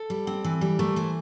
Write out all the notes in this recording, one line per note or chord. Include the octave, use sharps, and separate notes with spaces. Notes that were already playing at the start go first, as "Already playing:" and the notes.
Already playing: A4
G3
C4
E3
G3
A3 A#4
E3 C5